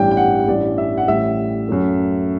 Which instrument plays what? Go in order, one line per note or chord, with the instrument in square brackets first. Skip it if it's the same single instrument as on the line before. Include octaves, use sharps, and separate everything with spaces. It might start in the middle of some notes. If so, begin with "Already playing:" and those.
Already playing: [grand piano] A1 G2 E3 G3 G5
G5
F#5
A1 G2 E3 G3 D5
E5
F#5
A1 A2 G3 E5
F#2 F#3 A3